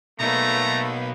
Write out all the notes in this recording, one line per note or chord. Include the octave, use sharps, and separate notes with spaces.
B2 A3 A#3 D#4 B4 A#5